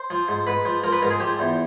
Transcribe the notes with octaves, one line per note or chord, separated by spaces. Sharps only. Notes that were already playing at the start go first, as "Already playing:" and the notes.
Already playing: C5
F3
G#2
G#2 B4
F3
F3 A#4
B4
G#2 A#4
G#4
F3 G4
E2